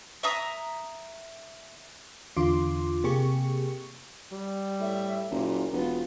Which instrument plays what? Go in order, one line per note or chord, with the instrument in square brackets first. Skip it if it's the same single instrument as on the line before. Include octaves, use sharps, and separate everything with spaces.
[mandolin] E5 A#5 D#6
[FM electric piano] E2 D3 F4 C6 D6
C3 A#3 G4 G#4 C#6 C#7
[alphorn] G3
[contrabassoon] A2 [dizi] E5
[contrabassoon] F#1 [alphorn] A#2 [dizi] A#5
[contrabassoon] E1 [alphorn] B3 [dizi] F4